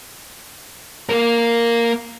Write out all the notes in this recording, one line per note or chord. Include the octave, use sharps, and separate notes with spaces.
A#3 A#4